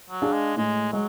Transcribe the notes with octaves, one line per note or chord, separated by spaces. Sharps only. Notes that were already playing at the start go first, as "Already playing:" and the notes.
F#3
D4 G#4 D5 F5
G#3
A2 G#3
F#3 G#3